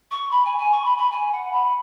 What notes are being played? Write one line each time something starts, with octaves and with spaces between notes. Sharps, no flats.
C#6
B5
G#5
G#5
C#6
B5
B5
G#5
F#5
B5